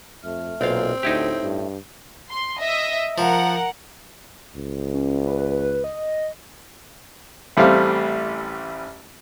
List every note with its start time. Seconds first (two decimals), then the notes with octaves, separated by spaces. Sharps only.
0.23 F2 A3 F6
0.61 B1 A#2 C4 F5
1.03 D2 A2 A3 D#4 E4 G4
1.42 G2
2.29 C6
2.59 D#5 E5
3.18 F3 A#4 F#5
4.56 C#2
4.94 C#4
5.27 B4
5.84 D#5
7.57 A1 G3 A3 C4 F5